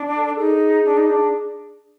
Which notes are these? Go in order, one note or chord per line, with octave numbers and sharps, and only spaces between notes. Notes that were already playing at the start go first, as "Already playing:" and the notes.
Already playing: D4
A4
D#4 G#4
D4
D#4
D4